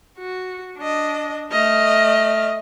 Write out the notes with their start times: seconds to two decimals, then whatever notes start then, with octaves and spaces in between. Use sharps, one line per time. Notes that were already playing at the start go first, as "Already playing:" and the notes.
0.17 F#4
0.78 D4 D#5
1.52 A3 D#5 F6